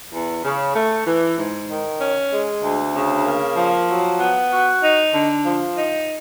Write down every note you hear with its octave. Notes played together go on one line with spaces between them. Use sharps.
E2
C#3
A3
E3
G#2
D#3
C#4
G#3
D2
C#3
A#3
F3
F#3
B3
F#4
D#4
D3
F3
D#4